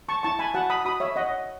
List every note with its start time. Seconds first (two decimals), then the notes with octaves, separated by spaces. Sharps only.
0.09 A5 C#6
0.23 E4 A5 C#6
0.39 G#5 B5
0.54 F#4 F#5 A5
0.70 B5 D#6
0.85 F#4 B5 D#6
1.00 C#5 E5
1.16 C#5 D#5 F#5